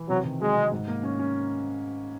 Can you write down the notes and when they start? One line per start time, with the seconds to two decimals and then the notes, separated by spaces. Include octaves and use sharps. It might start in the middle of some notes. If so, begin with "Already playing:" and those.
Already playing: E3
0.09 C3 F#3
0.25 D#3
0.40 F#3 G#3
0.56 C3
0.72 G#2
0.88 A#3
1.03 C#4
1.19 C#4